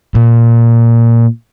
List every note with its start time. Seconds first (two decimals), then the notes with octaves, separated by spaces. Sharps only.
0.15 A#2